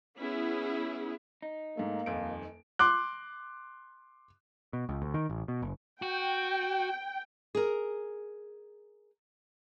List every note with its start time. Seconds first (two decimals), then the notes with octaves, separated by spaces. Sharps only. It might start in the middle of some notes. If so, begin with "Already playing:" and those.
0.18 B3 C#4 E4 G#4
1.42 D#4
1.77 G#2 A3 A#3
2.06 D#1 F2 D7
2.79 C6 D6 F#6
4.73 B2
4.89 C#2
5.02 D2
5.14 D#3
5.29 A1
5.48 B2
5.62 F#1
6.02 F#4 G5
7.55 G#4 A#4